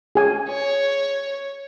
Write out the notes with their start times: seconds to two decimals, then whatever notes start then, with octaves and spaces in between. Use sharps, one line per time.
0.15 G#4 G#5
0.49 C#5